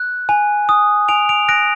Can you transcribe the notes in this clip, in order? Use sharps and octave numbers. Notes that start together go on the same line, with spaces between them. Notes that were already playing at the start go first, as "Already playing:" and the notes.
Already playing: F#6
G#5
D#6
G#5 D7 F7
D7 F7
F#6 A#6 D7